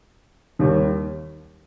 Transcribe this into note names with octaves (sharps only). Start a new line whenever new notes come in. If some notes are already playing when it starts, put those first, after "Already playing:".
D#2 D#3 G3